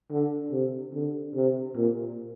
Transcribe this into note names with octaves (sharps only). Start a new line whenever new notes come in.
D3
C3
D3
C3
A#2